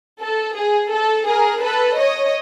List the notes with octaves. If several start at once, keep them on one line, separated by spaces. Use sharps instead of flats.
A4
G#4
A4
G#4 A#4
A4 B4
C#5 D#5